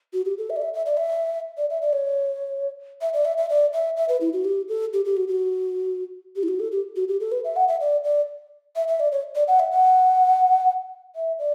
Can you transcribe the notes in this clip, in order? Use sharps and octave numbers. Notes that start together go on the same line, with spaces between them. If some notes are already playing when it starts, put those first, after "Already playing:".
F#4
G4
A4
E5
D5
E5
E5
D5
E5
D5
E5
D5
C#5
E5
D5
E5
E5
D5
E5
E5
B4
E4
F#4
G4
A4
G4
G4
F#4
F#4
G4
E4
F#4
A4
G4
F#4
G4
A4
B4
E5
F#5
E5
D5
D5
E5
E5
D5
C#5
D5
F#5
E5
F#5
E5
D5